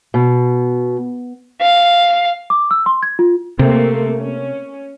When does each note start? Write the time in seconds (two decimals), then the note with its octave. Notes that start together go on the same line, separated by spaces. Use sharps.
0.14 B2
1.60 F5
2.50 D6
2.71 E6
2.86 C6
3.03 G#6
3.19 F4
3.59 C3 A3 A#3 C4
4.18 C#4